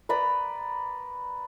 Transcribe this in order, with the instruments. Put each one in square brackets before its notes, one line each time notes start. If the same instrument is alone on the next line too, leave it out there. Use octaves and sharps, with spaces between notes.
[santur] B4 D5 A#5 B5